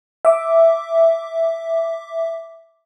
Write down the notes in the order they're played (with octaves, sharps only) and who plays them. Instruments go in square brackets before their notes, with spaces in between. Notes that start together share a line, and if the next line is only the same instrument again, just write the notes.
[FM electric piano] E5 D6